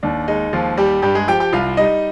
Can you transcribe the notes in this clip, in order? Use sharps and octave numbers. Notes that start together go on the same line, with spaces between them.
D#2 D4
G#3 D#4
D#2 F3 F4
G3 G4
G2 G3 G4
G#3 G#4
F3 G4 G5
G4 G5
C2 F4 F5
G3 D#4 D#5